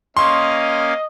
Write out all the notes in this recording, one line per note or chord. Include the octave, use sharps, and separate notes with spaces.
A#3 C#4 D#5 F5 C6 C#6